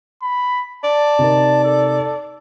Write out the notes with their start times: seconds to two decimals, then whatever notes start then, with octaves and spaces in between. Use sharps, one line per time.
0.22 B5
0.84 D5 A5
1.19 C3 D#4 A#4
1.63 A4